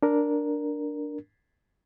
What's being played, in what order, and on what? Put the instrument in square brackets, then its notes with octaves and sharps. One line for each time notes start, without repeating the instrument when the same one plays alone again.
[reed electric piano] D4 A#4